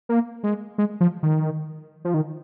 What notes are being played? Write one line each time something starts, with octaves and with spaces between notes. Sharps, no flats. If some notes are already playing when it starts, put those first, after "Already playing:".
A#3
G#3
G#3
F3
D#3
F3
D#3